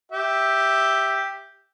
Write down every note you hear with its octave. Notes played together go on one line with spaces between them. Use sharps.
G4 E5